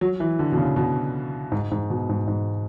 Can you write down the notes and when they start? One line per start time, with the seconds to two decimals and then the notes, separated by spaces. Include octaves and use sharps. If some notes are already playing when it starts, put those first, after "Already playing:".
0.01 F#3
0.20 E3
0.39 D3
0.52 B2
0.58 C#3
0.76 B2
1.52 G#2
1.72 G#2
1.90 B2
2.09 G#2
2.28 G#2